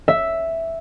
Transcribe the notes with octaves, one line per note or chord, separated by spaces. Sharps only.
E5